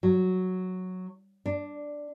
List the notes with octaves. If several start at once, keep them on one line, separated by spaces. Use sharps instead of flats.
F#3
D4